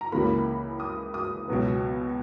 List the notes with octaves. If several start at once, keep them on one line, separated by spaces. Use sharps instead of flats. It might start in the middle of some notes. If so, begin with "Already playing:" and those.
A#5
C#2 C#3 E3 A#3 B5
D#6
D#6
C#2 B2 F#3 B3